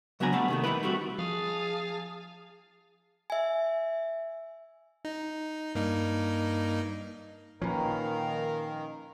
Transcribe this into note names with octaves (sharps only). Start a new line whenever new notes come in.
C#3 F#3 B3 D4 G#5 A#5
G3 A3 B3 A4 F5
C3 D#3 A3
D#3 E3 D#4 E4 B4
G3 A3 C4 F#4
F3 G#4 F5 A5 D#6
E5 G#5
D#4
G2 A#3 D#4
A#2 D#3 F3 C#4 A#4 B4 F5 A#5